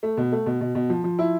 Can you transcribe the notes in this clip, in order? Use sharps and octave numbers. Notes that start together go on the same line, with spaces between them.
A3
B2
A3
B2
B2
B2
F3
F3
E4